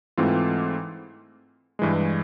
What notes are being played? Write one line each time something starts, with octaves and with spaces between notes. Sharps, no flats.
G#2 E3 A3 C4 F4
G2 E3 G#3